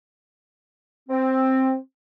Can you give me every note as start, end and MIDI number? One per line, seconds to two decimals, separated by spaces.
1.09 1.75 60